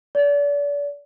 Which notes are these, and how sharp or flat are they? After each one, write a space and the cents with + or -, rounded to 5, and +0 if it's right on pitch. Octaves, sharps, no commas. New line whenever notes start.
D5 -35